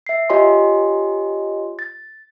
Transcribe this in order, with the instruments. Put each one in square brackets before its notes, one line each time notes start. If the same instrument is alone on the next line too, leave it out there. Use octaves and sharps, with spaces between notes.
[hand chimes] E5 C7
F4 G4 C#5 D#5 G#5 C6
A6